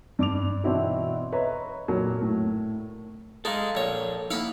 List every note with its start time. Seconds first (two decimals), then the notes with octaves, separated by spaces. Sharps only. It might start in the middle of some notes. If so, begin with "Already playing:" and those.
0.19 G2 D6 F7
0.64 B2 E3 C4 D4 E4 F#4
1.32 B4 C#5 D#5 E5 A#5 B5
1.88 A#2 F#3 A#3
2.18 A2 A#4
3.45 G#3 D#4 A4 F5
3.75 A#1 C#5
4.30 A#3 D#4 E4 F5 F#5 B5